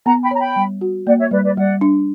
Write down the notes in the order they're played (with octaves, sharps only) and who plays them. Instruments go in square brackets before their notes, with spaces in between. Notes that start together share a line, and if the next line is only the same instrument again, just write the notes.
[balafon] B3 [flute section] F#5 A#5
[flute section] G5 B5
[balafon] C#5 [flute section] A#5
[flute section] G5 B5
[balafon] G3
F#4
[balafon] A#3 [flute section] D5 F#5
[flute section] C#5 E5
[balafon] G3 [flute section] B4 D5
[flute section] B4 D5
[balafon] G3 [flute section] D5 F#5
[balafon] D4